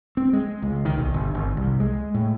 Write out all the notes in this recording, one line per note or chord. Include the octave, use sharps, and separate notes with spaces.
C4
G#3
C#2
D#3
B1
G1
G#1
C2
G#3
A2